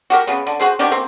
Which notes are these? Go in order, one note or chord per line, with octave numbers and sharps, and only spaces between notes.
F#4 G4 A#4
C#3 B3
D3
F#4 G#4 C5
D#3 D4 F#4 G4
A#3 C4